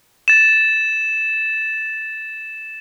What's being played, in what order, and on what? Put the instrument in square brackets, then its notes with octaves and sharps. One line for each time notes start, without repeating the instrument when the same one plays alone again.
[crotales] A6 E7